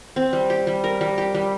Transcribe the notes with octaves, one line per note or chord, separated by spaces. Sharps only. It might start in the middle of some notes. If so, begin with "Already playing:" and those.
C4
G3
G4
G3
A#4
G3
G4
G3